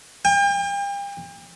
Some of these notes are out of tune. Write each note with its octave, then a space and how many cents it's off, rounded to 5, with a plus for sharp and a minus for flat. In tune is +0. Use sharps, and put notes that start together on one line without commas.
G5 +40